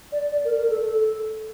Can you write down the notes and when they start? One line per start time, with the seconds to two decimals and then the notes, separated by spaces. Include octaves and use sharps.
0.12 D5
0.32 D5
0.45 A#4
0.57 A#4
0.70 A4